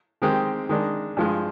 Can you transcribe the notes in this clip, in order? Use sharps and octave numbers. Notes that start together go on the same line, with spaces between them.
D#3 G#3 C4 G4
D#3 G#3 D4
G2 F3 G#3